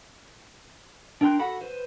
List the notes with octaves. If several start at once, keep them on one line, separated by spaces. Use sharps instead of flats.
D4 A#4 G5 C6 F#6
F#4 A4 F#5 B5
B4 C5